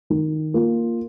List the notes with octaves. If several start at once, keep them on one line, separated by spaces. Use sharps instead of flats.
D#3
A#3 F4